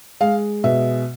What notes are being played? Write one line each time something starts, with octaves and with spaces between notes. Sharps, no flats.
G#3 F5
B2 E5